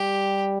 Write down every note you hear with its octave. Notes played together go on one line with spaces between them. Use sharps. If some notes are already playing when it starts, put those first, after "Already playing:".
Already playing: G3 G4